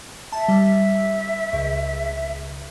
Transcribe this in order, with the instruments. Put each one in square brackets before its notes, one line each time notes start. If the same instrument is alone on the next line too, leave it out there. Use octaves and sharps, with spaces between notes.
[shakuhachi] E5 [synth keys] A5
[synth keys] G3
C#2